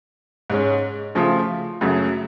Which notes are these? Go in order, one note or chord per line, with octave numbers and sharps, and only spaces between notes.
G#2 G#3 C#4
C#3 F3 A3 F4
F#2 C#3 F#3 A3